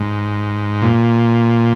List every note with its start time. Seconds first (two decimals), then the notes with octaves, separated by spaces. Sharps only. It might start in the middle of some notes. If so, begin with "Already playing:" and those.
Already playing: G#2
0.82 A#2